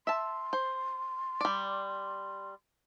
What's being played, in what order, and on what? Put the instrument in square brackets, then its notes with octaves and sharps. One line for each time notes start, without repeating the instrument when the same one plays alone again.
[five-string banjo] E5 A5 [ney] C6
[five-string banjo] C5
G3 D5